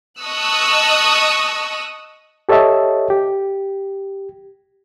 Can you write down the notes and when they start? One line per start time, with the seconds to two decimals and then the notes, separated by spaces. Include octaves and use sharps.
0.21 D#5 A5 C#6 D#6 E6 F#6
2.49 G4 A4 C#5 D#5 E5 A5
3.10 G4